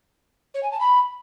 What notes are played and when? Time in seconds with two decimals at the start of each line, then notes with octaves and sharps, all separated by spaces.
0.54 C#5
0.63 G#5
0.72 A5
0.80 B5